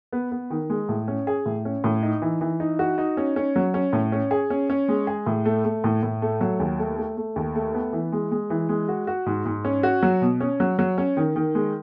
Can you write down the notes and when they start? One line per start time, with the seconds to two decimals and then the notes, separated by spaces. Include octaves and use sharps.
0.13 B3
0.32 B3
0.50 D#3
0.70 G#3
0.89 A2
1.08 C#4
1.27 G#4
1.46 A2
1.65 C#4
1.84 A2
2.03 D#4
2.22 E3
2.41 E3
2.60 D#4
2.79 F#4
2.98 D#4
3.17 C#4
3.36 C#4
3.56 F#3
3.74 C#4
3.93 A2
4.12 C#4
4.31 G#4
4.50 C#4
4.70 C#4
4.88 G#3
5.07 G#4
5.26 A2
5.45 A3
5.65 A3
5.84 A2
6.03 A2
6.22 A3
6.41 F#3
6.60 D#2
6.79 A3
6.98 A3
7.17 A3
7.36 D#2
7.55 A3
7.74 B3
7.93 E3
8.12 G#3
8.31 G#3
8.50 E3
8.69 G#3
8.88 F#4
9.07 F#4
9.26 G#2
9.45 G#2
9.65 C#4
9.83 F#4
10.03 F#3
10.22 B2
10.40 C#4
10.60 F#3
10.79 F#3
10.98 C#4
11.17 D#3
11.36 D#3
11.55 G#3